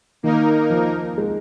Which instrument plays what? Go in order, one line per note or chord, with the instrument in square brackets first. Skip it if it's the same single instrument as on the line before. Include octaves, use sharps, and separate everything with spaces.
[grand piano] D#3 [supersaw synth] A#3 D#4 A#4
[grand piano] F3
G#3